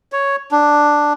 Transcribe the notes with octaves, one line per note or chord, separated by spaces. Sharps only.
C#5
D4